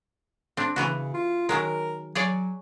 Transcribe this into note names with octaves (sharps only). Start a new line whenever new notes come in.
C4 D4
C#3 E3 B3 F#4
F4
D#3 F#3 G#3 A#4
F#3 G#4 C#5 D5